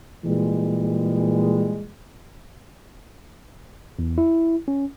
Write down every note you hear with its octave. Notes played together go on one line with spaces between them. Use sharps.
A#2 E3 G3 G#3
E2
E4
C#4